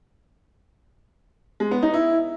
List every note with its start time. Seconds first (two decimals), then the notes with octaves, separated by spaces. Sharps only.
1.60 G#3
1.71 B3
1.83 D#4
1.94 E4